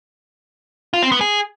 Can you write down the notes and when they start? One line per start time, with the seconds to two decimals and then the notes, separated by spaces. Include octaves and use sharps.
0.94 F4
1.03 C4
1.12 B3
1.21 G#4